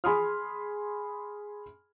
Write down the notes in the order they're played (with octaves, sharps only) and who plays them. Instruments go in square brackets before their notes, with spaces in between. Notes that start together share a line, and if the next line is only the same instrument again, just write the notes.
[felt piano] G#4 G#5 B5 C6 D#6 F6